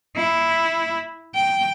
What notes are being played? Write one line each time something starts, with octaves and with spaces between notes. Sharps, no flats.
E4
G5